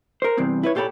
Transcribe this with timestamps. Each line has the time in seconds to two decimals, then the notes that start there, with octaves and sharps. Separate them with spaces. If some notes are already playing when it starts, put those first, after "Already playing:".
0.22 A#4 C5
0.37 E2 G2 C3 E3 C4
0.63 E4 B4 C#5
0.75 A#2 F4 G4 A4 C#5 B5